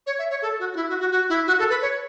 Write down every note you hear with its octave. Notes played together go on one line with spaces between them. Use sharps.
C#5
E5
C#5
A4
F#4
F#4
E4
F#4
F#4
F#4
E4
F#4
A4
B4
C#5